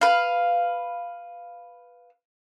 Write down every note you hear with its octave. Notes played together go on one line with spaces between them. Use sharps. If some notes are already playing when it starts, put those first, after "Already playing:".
B4 F5